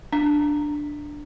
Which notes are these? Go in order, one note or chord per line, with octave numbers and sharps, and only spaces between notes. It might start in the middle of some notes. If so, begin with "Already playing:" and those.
D4